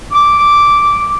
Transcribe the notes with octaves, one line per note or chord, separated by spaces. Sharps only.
D6